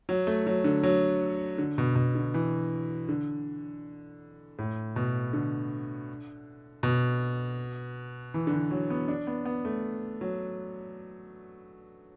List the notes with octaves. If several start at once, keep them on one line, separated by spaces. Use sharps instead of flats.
F#3
A3
F#3
D3
F#3
D3
B2
B2
D3
E3
D3
A2
B2
D3
B2
E3
D3
E3
F#3
B3
D4
B3
B3
A3
F#3